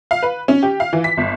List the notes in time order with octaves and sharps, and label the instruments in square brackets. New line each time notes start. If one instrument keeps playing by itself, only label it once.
[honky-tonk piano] F5
B4
C#4
G4
F5
E3
B6
G1